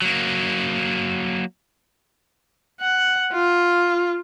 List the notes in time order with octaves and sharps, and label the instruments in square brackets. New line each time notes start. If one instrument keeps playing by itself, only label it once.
[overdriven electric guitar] F#3 A#3
[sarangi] F#5
F4